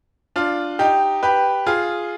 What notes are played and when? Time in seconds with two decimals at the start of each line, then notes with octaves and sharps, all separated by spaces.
0.36 D4 F4
0.79 D#4 G4
1.23 G4 B4
1.66 F4 G#4